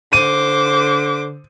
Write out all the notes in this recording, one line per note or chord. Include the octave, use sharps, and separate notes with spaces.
D3 C5 D6 D#7